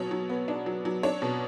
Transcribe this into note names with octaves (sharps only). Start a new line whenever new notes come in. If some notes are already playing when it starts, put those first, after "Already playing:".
Already playing: B2 F#3 C#5
F#3
B3
D4
F#3
F#3
D4 C#5
B2